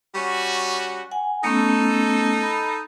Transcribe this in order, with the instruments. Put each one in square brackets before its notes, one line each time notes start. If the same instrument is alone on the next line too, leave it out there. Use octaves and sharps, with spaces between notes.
[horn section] G3 C#4 F#4 [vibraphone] C#6
[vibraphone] F#5 G#5
[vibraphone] A3 B3 C#4 [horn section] D#4 A4
[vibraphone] B5